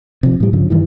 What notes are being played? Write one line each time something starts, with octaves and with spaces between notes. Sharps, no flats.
C3 F3
A2 G3
G2 C#3 F3
G2 D#3 E3